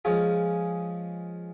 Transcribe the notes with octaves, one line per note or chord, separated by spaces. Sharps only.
F3 G#3 C#4 F4 G#4